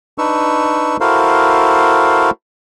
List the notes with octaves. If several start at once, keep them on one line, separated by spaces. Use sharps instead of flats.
D4 D#4 B4 C#6 E6
E4 F#4 A4 A#4 C5 F5